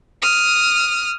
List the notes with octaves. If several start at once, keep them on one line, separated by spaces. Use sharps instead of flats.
D#6 F6